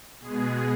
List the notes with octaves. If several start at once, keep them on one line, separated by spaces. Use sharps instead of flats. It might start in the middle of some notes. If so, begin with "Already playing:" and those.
B2 G#3 B3 G#4